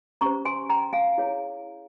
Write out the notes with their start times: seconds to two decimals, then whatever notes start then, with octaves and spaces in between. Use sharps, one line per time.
0.21 C#4 G4 C5 A#5 C#6
0.45 G#5 C6
0.69 G5 A#5
0.93 F5 G#5
1.18 E4 G#4 C#5